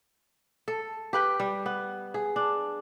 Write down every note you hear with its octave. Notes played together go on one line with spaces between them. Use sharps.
A4
G4 B4 G5
G3
B3
G#4
D4